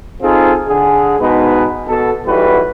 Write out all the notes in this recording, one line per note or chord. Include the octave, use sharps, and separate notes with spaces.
C4 D#4 F4 G#4 A4
D3 G#4
G#2 B2 G#3 D#4 B4
B2 A4
B1 E3 G3 F#4 B4